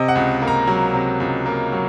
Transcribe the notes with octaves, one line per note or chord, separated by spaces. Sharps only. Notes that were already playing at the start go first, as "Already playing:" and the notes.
Already playing: C3 D#5
F#5
C#2
A#3
A#5
F#3
C3
C#2
A#3
F#3